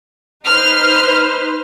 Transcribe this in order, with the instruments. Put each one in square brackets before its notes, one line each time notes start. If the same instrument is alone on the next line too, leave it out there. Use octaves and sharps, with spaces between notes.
[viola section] D#4 B4 C5 [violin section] F6